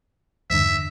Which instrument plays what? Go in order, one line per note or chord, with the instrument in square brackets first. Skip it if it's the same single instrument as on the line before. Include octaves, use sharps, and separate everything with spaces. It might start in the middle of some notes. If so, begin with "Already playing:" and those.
[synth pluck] E2 G2 D3 [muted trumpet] E5